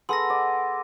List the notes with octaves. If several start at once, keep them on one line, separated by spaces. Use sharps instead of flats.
B3 G#4 A4 C6 E6 A#6
D5